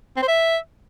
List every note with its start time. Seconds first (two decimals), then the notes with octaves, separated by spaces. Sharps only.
0.17 C4
0.22 C5
0.28 E5